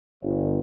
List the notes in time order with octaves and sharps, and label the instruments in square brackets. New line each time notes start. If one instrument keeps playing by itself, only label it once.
[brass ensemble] G1